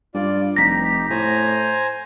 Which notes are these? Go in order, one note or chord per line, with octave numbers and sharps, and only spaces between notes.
G2 F4 D5
F1 D#4 G4 A#6 B6
A2 C5 G#5 A#5